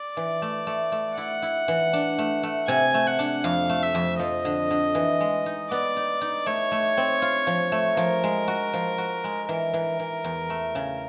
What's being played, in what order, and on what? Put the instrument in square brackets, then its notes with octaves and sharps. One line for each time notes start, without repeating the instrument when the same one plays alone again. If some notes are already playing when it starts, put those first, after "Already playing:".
Already playing: [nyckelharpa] D5
[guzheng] E3
A3
A3
A3
[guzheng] E4 [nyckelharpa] F#5
[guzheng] E4
E3
D4
A3
A3
[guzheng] C3 [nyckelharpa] G#5
[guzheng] A3
[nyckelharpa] F#5
[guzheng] D4
[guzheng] F2 [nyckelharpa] F5
[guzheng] A3
[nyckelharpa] E5
[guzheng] F2
[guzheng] F3 [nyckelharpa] D#5
[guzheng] D3
D3
E3
G#3
D#4
[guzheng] B3 [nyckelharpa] D5
[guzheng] D#4
D#4
[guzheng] A3 [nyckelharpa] C#5
[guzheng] A3
C4
F4
F3
A3
[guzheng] F3 [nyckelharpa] A#4
[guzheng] G#3
F#4
F3
F#4
G#3
[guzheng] E3 [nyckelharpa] A#4
[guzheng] E3
E3
E2
A3
C#3